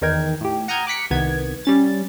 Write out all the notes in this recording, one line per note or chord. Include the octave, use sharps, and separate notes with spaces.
E2 D#3 D#4 A#4 G5 G#6
A2 G4
F#5 A#5 D#6 F6 G6 G#6
D6 F#6 B6 C#7
C2 D#3 B3 G#6
G3 C#4 A6